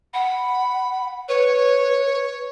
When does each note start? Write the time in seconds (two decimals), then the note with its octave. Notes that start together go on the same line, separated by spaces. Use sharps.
0.13 F#5 B5
1.28 B4 C#5